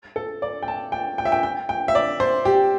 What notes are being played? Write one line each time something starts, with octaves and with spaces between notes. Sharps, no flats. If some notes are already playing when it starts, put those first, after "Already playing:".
A4
D5
G5
A5
G5
G5
E5
G5
G5
G5
E5
D5
C5
G4